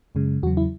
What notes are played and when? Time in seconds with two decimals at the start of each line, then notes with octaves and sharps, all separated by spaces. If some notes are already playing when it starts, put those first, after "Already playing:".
0.15 F#2 C#3 G#3
0.43 E2 C#3 F#3 F#4
0.57 E4